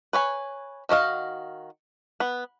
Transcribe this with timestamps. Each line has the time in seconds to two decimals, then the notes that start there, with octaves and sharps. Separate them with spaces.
0.13 B4 C#5 G#5
0.89 D#3 F#4 D#5 F5
2.20 B3